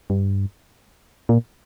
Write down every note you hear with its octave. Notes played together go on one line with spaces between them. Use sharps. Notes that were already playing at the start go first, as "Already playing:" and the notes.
G2
A#2